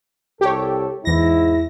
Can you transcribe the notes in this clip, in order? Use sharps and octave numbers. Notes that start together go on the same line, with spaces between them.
C2 G4 A4 C#5
E2 G#2 E4 A#6